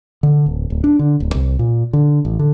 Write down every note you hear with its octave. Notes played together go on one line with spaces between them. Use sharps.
D3
D1
D1
D4
D3
D1
C2
A#2
D3
A1
D3